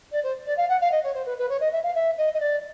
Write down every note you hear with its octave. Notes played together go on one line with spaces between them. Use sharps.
D5
C5
D5
F5
F#5
F5
D#5
C#5
C5
B4
B4
C#5
D#5
E5
F5
E5
D#5
D#5
D5